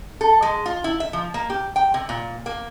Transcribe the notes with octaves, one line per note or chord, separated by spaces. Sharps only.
A4
G#3
F4
E4
E5
F3
A#3
G4
G5
C3
A#2
A#3